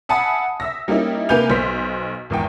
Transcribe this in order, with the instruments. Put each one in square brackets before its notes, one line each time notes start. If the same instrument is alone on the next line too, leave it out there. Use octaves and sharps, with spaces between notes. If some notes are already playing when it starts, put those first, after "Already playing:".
[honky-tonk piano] E5 F#5 G#5 A5 B5 D#6
E5 E6 A#6
G3 A#3 C#4 D#4 E4
C3 A#3 B4 G#5 G6 F7
B1 C5 C6 B6
G#1 E2 G5